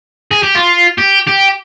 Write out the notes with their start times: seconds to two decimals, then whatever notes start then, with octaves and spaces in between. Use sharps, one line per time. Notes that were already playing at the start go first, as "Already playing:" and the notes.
0.31 G#4
0.43 G4
0.55 F4
0.98 G4
1.28 G4